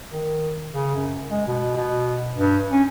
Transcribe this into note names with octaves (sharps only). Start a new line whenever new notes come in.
D#3
C#3
F#2
G#3
B2
B2
G2
C#4